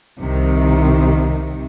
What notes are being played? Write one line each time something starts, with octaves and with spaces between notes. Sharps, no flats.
C2 C3 D#3